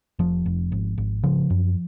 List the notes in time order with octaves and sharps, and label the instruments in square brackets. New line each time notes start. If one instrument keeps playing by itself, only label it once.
[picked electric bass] F1 F3
F1
G#1
G#1
C#3 F3
F#2